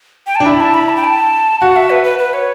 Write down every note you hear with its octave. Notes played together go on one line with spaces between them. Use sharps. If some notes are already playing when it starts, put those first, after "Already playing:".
G5
A5
D4
E4 B5
A5
B5
A5
G5
A5
F#4 F#5
E5
B4
B4
B4
C#5